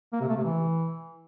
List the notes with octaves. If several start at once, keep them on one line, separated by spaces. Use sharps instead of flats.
A#3
C3
A3
C3
E3